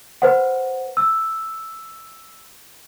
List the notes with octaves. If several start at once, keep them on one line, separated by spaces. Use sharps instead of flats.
B4 C5 F#5
E6